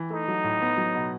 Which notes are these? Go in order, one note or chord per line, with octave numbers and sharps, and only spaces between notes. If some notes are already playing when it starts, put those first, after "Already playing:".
Already playing: E3
A3 D#4
F#3
A2
B3
F#3
B2